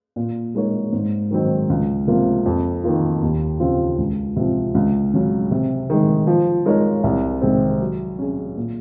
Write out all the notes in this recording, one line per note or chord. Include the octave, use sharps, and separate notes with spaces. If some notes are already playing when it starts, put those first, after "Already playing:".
A#2
G#3 D#4 A#4 C#5
G#2
D#3 F#3 C4 D#4
C#2
C3 F3 A#3 F4
F2
D#3 A#3 F4
D#2
C#3 F3 C4 F4
C#2
C3 F3
C#2
C#3 F#3 C#4
C3
D#3 G#3
F3
G#3 D#4 A#4 C#5
C2
C3 D#3 G#3 C4
F#3
C#4 G#4
A#2